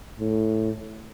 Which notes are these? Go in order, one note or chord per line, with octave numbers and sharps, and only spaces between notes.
A2